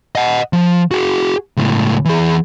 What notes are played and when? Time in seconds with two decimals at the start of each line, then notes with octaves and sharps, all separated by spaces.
0.15 D#5 F#5
0.53 F3
0.91 F#4 G#4
1.57 C#2 A2
2.05 E3 G#4